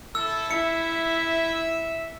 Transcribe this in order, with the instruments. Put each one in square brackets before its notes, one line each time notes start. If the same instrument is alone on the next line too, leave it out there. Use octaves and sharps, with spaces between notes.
[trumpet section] E4 A4 [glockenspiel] E6
[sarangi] E4 [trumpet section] E5 [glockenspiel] C#7